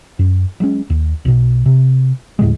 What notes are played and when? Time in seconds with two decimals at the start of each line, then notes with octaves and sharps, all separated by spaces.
0.19 F#2
0.60 F#3 G#3 C#4
0.90 D#2
1.25 B1 B2
1.66 C3
2.39 D#2 A2 D3 G#3